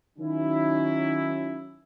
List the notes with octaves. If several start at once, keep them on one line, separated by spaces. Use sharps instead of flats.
D#3 F#3 C#4 E4